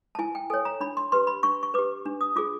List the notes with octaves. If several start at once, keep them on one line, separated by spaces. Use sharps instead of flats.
A5
E4 G#5
G5
A4 C#5 G#5
A#5
D4 B5
C6
G4 B4 C6
B5
D4 C#6
C#6
G4 B4 D6
D4
D#6
F4 G#4 D6